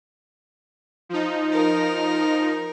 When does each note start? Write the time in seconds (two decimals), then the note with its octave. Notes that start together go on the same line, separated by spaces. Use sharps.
1.09 F3 D#4
1.53 A#4